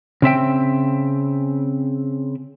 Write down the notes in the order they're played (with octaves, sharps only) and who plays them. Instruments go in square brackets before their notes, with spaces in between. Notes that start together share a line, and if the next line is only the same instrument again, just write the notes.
[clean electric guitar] C#3 C4 E5 G5